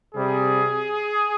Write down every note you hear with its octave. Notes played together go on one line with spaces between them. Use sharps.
C3 G3 G#4